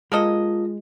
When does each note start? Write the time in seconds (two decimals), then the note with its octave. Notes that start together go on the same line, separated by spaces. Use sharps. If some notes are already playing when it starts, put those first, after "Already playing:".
0.12 G#3 A#3 F4 A4 D#5